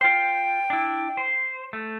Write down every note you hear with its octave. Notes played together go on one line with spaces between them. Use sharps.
F4 C5 G5
D4 E4
C5
A3